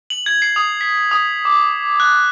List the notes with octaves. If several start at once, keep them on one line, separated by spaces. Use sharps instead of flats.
F#7
G#6
C7
D#6
B6
D#6
D6
F#6